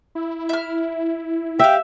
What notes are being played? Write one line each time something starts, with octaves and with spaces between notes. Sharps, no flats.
E4
E5 F6
G4 E5 F5 G5